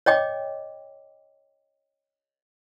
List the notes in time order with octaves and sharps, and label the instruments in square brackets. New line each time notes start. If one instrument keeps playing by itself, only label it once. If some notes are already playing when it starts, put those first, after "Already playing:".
[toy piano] C#5 D#5 G5 D6